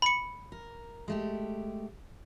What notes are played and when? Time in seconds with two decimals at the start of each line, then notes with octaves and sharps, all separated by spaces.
0.02 B5 C#7
0.52 A#4
1.08 G#3 A3 G4